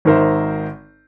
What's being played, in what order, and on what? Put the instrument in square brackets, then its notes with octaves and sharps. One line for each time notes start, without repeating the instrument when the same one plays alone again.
[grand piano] G#1 D#4 A#4 C5 E5